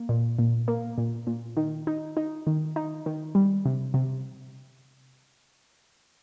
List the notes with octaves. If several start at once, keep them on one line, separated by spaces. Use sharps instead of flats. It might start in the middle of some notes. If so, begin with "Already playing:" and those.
Already playing: A#3
A#2
A#2
A#3
A#2
A#2
D#3
D#4
D#4
D#3
D#4
D#3
G3
C3
C3